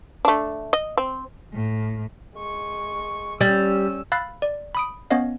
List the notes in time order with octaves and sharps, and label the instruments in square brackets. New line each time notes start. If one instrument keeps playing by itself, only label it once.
[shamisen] A3 D4
D#5
C4
[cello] A2
[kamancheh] G#3 C#6
[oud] G3 [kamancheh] C#4 E6
[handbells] F5 B5 E6 F#6 A6 C7
D5
B5 D#6 D7
B3 C#4 C#5 D#5 F5